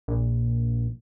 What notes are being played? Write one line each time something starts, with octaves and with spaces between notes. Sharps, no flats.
A#1